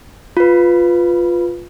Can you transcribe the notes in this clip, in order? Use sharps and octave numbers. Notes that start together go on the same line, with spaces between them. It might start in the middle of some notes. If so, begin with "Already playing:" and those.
F4 B4